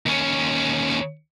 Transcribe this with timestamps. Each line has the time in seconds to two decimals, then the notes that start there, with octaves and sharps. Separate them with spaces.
0.06 D#2 C#4